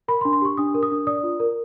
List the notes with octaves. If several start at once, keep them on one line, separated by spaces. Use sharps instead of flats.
A#4 B5
C6
D4
C6
G4 C#6
D4 D#6
A#4
D#6
D4
D5 D#6
F4
A#4